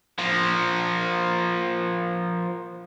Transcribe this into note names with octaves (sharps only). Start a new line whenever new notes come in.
F3 A#3